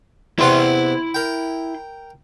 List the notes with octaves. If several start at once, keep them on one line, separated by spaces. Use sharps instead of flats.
E2 C3 E4 F#5 C6
A#4 G5